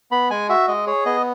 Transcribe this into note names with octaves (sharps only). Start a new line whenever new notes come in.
B3 B5
G#3 G#5
F#4 E5
G#3 D#5
G#4 C#5
B3 D#5